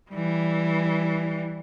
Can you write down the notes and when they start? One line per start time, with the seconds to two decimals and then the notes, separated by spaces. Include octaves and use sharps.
0.10 E3 G3